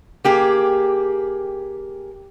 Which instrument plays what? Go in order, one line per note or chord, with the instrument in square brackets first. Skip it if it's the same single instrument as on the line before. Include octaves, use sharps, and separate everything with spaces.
[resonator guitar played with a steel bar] A#3 G4 G#4